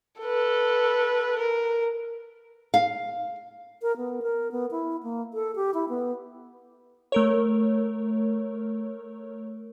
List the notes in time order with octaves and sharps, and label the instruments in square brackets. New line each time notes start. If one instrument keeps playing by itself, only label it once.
[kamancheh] A4 B4
A#4
[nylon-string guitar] F5
[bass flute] A#4
B3
A#4
B3
E4
A#3
A4
G4
E4
B3
[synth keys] A3 A#4 C#5